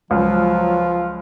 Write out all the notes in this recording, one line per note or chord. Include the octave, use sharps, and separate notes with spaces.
C#2 F3 F#3 F4